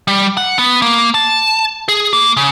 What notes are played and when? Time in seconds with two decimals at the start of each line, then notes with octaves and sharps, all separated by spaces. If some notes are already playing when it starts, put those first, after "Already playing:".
0.08 G3
0.37 F#5
0.59 B3
0.82 A#3
1.14 A5
1.88 G#4
2.13 A#3
2.37 C#3